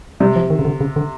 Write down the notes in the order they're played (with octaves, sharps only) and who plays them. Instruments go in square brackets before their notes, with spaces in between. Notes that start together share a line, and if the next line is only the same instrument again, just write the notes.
[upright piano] C3 [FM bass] G3
[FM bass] F3
D#3
C#3
D3
C#3
D3